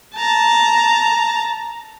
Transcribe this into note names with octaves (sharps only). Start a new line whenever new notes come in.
A5 A#5